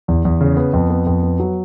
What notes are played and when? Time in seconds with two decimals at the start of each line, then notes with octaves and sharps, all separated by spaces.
0.08 E2
0.25 E2
0.41 C#3
0.57 B3
0.73 F2
0.90 B3
1.07 F2
1.23 B3
1.40 F#3